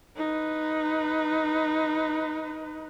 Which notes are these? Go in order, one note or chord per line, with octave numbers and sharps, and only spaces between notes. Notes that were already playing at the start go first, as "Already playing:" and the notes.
D#4 B4